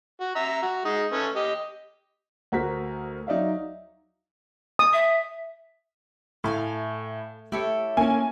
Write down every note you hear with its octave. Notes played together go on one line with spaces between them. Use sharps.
F#4
E5 A#5
F#4
G#3 D#4
A3 C#4 B4
G4 D#5
D2 F#4 A#4 C5 B6
F#3 D#4 D5 E5 F5
D#6
E5
A2 A3 A4 F5 G#5
A3 E4 G4 A4 C#5
A#3 C#4 G#5